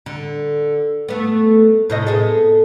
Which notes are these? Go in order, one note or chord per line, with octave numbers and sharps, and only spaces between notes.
D3
A3 B3
A2 C3 D#5
B3 G#4 A4